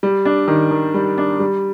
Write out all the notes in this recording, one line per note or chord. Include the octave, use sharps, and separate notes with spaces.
G3
D4
D#3
D#3
G3
D4
G3